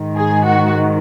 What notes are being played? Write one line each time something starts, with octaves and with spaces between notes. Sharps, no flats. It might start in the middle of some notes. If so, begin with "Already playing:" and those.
Already playing: G#2 D#3
G#4
F#4